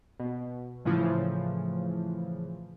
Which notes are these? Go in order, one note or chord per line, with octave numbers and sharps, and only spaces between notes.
B2
A2 C#3 E3 F3